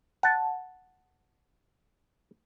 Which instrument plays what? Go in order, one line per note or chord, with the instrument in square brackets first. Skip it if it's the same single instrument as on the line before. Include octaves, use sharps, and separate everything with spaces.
[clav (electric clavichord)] F#5 A5